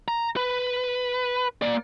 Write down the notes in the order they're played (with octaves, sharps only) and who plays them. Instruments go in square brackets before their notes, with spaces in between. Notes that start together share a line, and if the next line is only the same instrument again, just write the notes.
[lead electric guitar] A#5
B4
A#3 D5